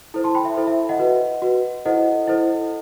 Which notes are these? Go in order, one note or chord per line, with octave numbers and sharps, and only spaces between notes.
E4 A4 C5
A5 C6
G5 B5
E5
E4 A4 C5
E5
D#5 F#5
F#4 B4
F#4 B4
E4 A4 C5 D#5 F#5
E4 A4 C5